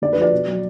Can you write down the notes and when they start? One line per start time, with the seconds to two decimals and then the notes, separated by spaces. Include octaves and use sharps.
0.02 D3 D5
0.13 B4
0.17 F3 D5
0.33 B2
0.47 F#3